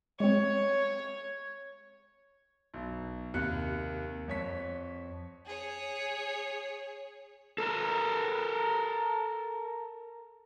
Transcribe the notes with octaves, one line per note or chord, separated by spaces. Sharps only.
G#3 C4 C#5
B1
D#2 C3 F#6 C#7
F2 C#5 B6
G#4 C#5
A4 A#4